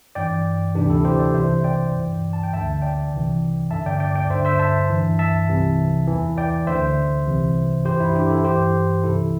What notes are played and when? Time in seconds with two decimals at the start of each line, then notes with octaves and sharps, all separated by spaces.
0.15 G2 E3 D5 G5
0.75 D2 C3 E3 D4 G4
0.90 E4 A4
1.04 G4 C5
1.19 A4 D5
1.34 C2 C3 E3 C5 E5
1.64 D5 G5
1.93 G2 E3
2.33 A5
2.43 G5
2.53 D2 D3 E5 A5
2.82 D5 G5
3.12 C2 C3 E3
3.71 G2 D3 E5 A5
3.86 D5 G5
4.00 D5 G5
4.15 D5 G5
4.30 G2 D3 C5 E5
4.45 C5 E5
4.59 E5 A5
4.89 G2 E3
5.19 E5 A5
5.49 C2 C3 E3
6.07 E2 E3
6.38 D5 G5
6.67 D2 D3 C5 E5
7.26 C2 C3 E3
7.85 G2 E3 G4 C5
8.00 E4
8.15 D4 G4
8.30 E4 A4
8.44 G2 E3 G4 C5
9.03 C2 C3 E3 E4 A4